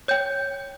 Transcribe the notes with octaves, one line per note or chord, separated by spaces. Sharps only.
C#5 G5 G6